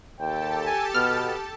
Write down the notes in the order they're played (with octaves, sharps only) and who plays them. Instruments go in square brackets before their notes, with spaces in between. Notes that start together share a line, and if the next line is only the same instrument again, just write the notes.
[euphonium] D#2 [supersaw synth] G4 A4 A5 [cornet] G5
[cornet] G#5
[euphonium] B2 [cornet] B3 [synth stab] F6